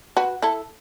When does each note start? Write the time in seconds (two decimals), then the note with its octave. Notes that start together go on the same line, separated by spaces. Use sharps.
0.17 F#4 B4
0.42 E4 A4